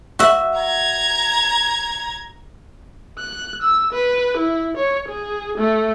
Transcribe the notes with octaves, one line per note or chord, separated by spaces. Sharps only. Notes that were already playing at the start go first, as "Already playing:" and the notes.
F#4 E5
A#5 G#6
F#6
E6
B4
E4
C#5
G#4
A3